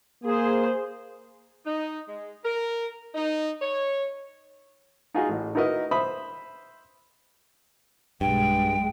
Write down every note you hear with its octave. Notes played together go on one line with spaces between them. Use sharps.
A#3 G#4 C5
D#4
G#3
A#4
D#4
C#5
D#4 F4 F#4 G#4 D#5
A1
D#4 E4 F#4 A#4 B4 D#5
C5 E5 B5 D#6
B1 G2 G#3 G5